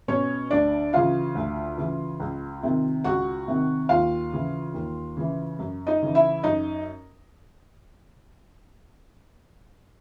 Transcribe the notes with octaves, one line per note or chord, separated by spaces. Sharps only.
B2 C#4 C#5
D2 D4 D5
C#3 E3 F4 F5
D2
C#3 E3
C#2
C3 D#3
C#2 F#4 F#5
C3 D#3
D#2 F4 F5
C#3 E3
D#2
C#3 E3
F#2
D#4 D#5
C#3 E3
E4 E5
F#2 D#4 D#5